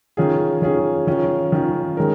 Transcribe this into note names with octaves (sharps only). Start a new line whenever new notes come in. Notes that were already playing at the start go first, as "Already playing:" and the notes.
D#3 C#4 F4 G#4
D#3 C#4 F4 G#4
D#3 C#4 F4
D#3 C#4 F4
D#3 G#3 C#4 A#4